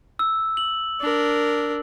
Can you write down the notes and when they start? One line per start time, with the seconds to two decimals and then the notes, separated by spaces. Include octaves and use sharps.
0.19 E6
0.57 F#7
1.01 D4 A#4